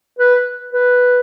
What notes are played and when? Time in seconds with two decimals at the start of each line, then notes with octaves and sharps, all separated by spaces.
0.19 B4
0.73 B4